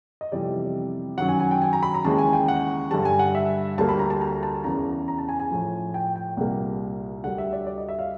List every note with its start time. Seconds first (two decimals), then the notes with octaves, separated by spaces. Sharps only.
0.21 D#5
0.32 F2 C3 E3 G3 B3 D5
1.18 F#2 D#3 F#3 F#5
1.29 G#5
1.40 G#5
1.51 G5
1.62 G#5
1.73 A#5
1.83 B5
1.94 A#5
2.05 D#2 C#3 E3 G#3 A5
2.18 G#5
2.33 G5
2.48 F#5
2.91 G2 D3 G3 A5
3.05 G#5
3.19 F#5
3.35 E5
3.78 D2 D3 G3 A#3 A5
3.89 B5
3.99 A#5
4.10 A5
4.21 A#5
4.43 A5
4.64 E2 C#3 E3 A#5
5.08 A#5
5.18 A5
5.29 G#5
5.39 G#5
5.50 A2 F3 A3
5.94 G5
6.16 G5
6.37 C2 A#2 G3 A#3 F#5
7.24 D2 D3 G3 F#5
7.38 E5
7.53 D5
7.67 D5
7.78 D#5
7.89 E5
7.99 F5